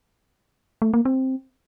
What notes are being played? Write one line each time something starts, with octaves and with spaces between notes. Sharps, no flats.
A3
A#3
C4